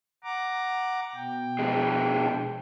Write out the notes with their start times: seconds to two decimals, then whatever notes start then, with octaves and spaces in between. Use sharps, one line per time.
0.24 F#5 A#5 D6
1.15 B2 G5
1.59 F2 G#3